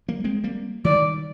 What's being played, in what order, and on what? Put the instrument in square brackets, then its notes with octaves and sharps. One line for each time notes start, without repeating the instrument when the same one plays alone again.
[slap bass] G3 A#3
G#3 C4
G3 A#3
[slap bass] D#3 G3 [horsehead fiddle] D5